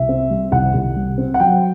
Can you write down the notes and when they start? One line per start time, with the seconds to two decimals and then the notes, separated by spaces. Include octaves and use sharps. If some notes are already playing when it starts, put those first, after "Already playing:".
Already playing: C2 E5
0.09 C4
0.30 G3
0.52 C2 F#5
0.74 C2
0.96 G3
1.18 C4
1.34 F#5
1.40 F#3 G5